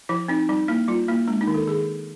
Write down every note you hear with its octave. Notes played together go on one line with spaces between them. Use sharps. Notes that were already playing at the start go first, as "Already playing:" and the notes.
F3 E4
C4 D#4
G3 D#4
A#3 E4
G3 F4
A#3 E4
G#3 D4
D#4
D#3
A4
D#3 G#4